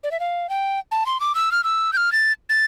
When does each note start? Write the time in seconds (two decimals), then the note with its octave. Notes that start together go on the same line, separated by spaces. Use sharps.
0.04 D5
0.11 E5
0.20 F5
0.49 G5
0.92 A5
1.06 C6
1.20 D6
1.35 E6
1.52 F6
1.64 E6
1.93 G6
1.97 F6
2.12 A6
2.50 A6